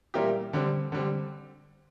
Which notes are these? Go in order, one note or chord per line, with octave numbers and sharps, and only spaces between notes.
A#2 G3 A#3 E4 G4
D3 G3 C4
D3 G3 C4